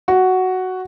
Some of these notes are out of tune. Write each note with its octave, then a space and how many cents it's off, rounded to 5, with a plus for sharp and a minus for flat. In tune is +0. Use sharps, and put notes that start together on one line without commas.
F#4 +5